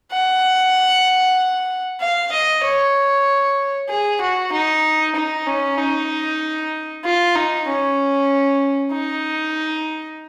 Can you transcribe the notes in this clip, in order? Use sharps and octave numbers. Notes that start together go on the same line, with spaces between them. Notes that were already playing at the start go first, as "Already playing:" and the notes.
F#5
F5
D#5
C#5
G#4
F#4
D#4
D#4
C#4
D#4
F4
D#4
C#4
D#4